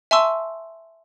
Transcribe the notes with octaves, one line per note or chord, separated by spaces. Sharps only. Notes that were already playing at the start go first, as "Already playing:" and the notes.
E5 G#5 A5 C6 C#6 E6